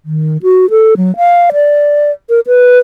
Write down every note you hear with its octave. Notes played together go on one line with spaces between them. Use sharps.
D#3
F#4
A4
F#3
F5
D5
A#4
B4